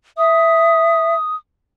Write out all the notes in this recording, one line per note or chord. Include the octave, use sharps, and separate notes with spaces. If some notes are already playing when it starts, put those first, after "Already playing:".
E5 D#6